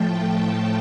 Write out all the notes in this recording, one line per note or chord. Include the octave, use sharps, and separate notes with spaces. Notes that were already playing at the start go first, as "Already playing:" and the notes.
Already playing: A2 F3 A3 G5 A5